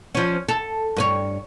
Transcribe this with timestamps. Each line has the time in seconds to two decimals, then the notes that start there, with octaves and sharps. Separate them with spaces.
0.15 F3 C#4
0.48 A4
0.97 G2 B4 C#5